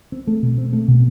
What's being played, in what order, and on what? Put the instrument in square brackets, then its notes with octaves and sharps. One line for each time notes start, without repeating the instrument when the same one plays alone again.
[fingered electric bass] C4
A3
B2
C4
A3
B2